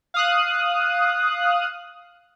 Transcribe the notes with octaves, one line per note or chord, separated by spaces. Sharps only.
F5 D#6 F#6